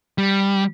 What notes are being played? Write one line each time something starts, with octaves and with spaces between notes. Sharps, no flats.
G3